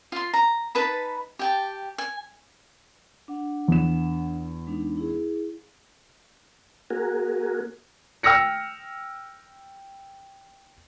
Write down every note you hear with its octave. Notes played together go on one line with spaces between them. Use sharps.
F4 C6
A#5
D#4 B4 A5 B5
G4 G5 A5
G#5
D4 F#5
E2 E7
G#3 D4 D#4
E4 G#4
A#3 F#4 G#4 A#4
G5 E6 F6 A#6 C#7